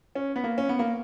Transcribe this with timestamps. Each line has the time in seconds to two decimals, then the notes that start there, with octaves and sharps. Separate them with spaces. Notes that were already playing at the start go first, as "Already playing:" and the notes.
0.15 C#4
0.36 B3
0.44 A#3
0.58 C#4
0.69 B3
0.79 A#3